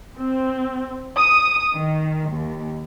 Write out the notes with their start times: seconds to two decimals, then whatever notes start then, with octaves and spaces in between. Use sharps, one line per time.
0.18 C4
1.17 D#6
1.73 D#3
2.32 D#2